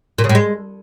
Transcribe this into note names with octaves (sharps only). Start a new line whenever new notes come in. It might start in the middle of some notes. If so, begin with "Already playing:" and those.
A#2
C#3
A2
G#3